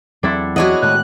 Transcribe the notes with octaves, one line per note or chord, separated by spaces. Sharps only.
E2 F#3 C4 D4 E4 A4
B3 D4 E4 F#4 C#5 D#5
A2 D#3 G#3 F#6